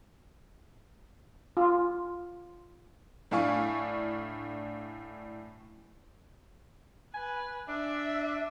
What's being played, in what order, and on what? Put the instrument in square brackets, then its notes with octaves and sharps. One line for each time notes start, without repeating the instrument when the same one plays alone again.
[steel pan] F4
[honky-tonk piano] A2 D4 E4 F5 G#5 C#6
[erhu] B4 [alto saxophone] G#5
[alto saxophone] D4 [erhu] E5